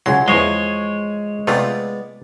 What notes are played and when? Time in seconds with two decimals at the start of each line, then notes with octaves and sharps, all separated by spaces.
0.06 C#2 F#3 F#5 G#5 C6 G#6
0.28 E2 F3 G#3 C#5 D#5 C7
1.47 C3 A3 B3 F4 G#4 D5